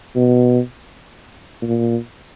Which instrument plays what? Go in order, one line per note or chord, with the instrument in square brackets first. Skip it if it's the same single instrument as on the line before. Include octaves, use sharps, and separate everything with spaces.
[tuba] B2
A#2